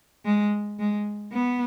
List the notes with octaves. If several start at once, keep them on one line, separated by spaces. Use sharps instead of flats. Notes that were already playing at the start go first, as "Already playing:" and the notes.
G#3
G#3
B3